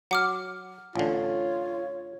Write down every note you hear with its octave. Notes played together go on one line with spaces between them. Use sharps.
F#3 F#5 D6 F6
A1 D3 F4 C#5